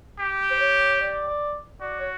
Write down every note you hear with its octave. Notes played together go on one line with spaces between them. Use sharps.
G4
C5
C#5
D5
D5
F#4 D5
C#5